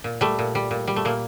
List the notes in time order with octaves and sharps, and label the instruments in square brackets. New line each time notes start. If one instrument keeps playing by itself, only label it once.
[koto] A#2
G3 A3
A#2
G3
A#2
G3
A3
A#2 A#3